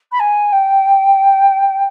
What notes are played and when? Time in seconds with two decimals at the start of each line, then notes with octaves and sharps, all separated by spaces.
0.12 B5
0.20 G#5
0.52 G5